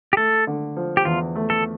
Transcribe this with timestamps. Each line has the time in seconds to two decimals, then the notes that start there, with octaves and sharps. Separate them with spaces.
0.13 G4
0.17 A3 A4
0.47 D3
0.76 F3
0.97 G4
1.05 E2 F4
1.35 A3
1.50 A4